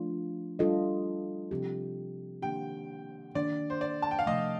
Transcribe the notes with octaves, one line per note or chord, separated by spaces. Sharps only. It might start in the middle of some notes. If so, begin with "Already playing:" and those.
Already playing: F3 A3 D4 F4
G3 D4 F4 A4 D#5
C3 F3 C4 G4
D#3 A#3 D4 G4 G5
D#3 A#3 D4 D5
C5
D5
A5
G5
F5
C3 F3 A3 D#5